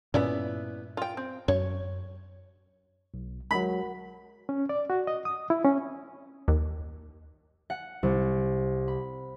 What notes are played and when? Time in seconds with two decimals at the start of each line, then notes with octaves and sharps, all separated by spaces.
0.14 G2 A#2 B3 C#4 E4 D5
0.97 F4 G5
1.17 C4
1.48 F#2 C#5
3.14 B1
3.51 F#3 G#3 A#4 F#5 B5
4.49 C#4
4.69 D5
4.90 F#4
5.07 D#5
5.25 D#6
5.50 E4
5.64 C#4
6.48 D#2
7.70 F#5
8.03 C2
8.88 B5